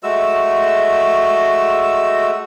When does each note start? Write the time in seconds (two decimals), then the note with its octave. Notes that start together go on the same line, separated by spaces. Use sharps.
0.03 G#3 A3 F#4 E6